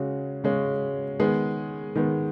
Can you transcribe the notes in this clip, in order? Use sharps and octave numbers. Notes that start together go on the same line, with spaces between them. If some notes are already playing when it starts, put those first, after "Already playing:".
Already playing: C#3 G#3 C#4 F#4
C#3 G#3 C#4
D#3 G#3 B3 G#4
D#3 G#3 B3